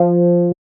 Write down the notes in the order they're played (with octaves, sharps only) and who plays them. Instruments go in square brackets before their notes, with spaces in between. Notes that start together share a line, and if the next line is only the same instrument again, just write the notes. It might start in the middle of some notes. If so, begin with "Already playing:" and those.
Already playing: [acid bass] F3